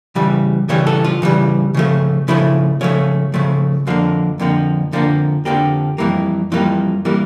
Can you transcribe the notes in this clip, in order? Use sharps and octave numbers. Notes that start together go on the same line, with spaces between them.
C#3 E3 G3
C#3 E3 G3 C#5
A4
F4
C#3 E3 G3
C#3 F3 A3
C#3 F3 A3 E4
C#3 F3 A3 C#5
C#3 F3 A3
F2 D3 F3 A#3 F5
F2 D3 F3 A#3
F2 D3 F3 A#3
F2 D3 F3 A#3 G4
F2 E3 G3 A#3
F2 E3 G3 A#3 F4
E3 G3 A#3